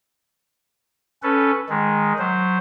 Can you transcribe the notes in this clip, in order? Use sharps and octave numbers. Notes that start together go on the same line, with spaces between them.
C#4 A4 B4
D#3 G#3
F#3 C5